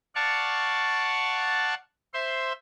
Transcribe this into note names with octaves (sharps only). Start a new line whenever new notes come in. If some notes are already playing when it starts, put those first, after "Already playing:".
D5 F5 F#5 A5 C#6
C5 E5 C6